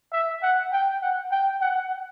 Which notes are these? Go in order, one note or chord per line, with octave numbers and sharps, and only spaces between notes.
E5
F#5
G5
F#5
G5
F#5